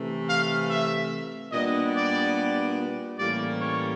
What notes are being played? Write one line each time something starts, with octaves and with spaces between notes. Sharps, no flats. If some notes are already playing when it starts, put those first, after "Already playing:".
Already playing: C3 E3 A3
F5
E5
A#2 G3 B3 D4 D#5
D5
A2 E3 G3 A#3 C#4 D5
C#5